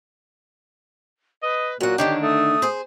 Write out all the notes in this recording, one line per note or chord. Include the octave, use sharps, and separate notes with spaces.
B4 D#5
A#2 F#3 F#4 F#5
D3 D#3 D4 G4 C#5
A3 D#6
G#4 C5